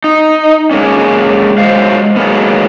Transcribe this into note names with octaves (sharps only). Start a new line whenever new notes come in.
D#4
G#3 A#3 C#4
F#3 G#3 C5 F5
F#3 G#3 A#3 B3